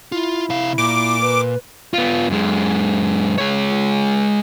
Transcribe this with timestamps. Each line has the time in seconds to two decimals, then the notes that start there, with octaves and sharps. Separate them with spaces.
0.12 E4 F4
0.50 C3 F5
0.78 A#2 D6
1.21 B4
1.94 B3 F4
2.30 F#2 G#3
3.38 G#3 C#5